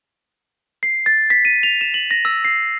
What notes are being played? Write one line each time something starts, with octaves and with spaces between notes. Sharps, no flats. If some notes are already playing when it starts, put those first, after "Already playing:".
C7
A6
B6
D#7
F7
E7
F#7
A#6
E6
C7